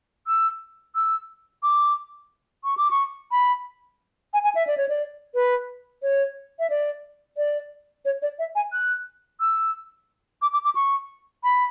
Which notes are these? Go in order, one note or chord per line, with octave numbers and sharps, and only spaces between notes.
E6
E6
D6
C#6
D6
C#6
B5
G#5
G#5
E5
D5
C#5
D5
B4
C#5
E5
D5
D5
C#5
D5
E5
G#5
F#6
E6
D6
D6
D6
C#6
B5